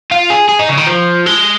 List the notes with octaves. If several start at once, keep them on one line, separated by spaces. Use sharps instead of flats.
F4
G#4
G#4
D#4
C#3
D#3
F3
G#3